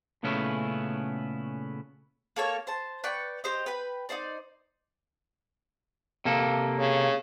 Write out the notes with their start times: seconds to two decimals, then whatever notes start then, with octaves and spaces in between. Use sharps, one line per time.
0.23 A#2 C#3 A3 B3 C#4 E4
2.36 A#3 A4 C#5 F6
2.67 C5 A5
3.04 B4 D5 G5 C#6
3.44 G4 C5 D#5
3.66 B4 G5 B5
4.09 D#4 E4 C5 D5
6.25 C3 A#3 A4
6.79 C#3